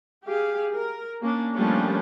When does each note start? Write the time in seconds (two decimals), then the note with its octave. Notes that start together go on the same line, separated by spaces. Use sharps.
0.25 G4 G#4 F5
0.74 A#4
1.21 A#3 C#4 D4
1.54 F3 G3 A3 A#3 C#4 D4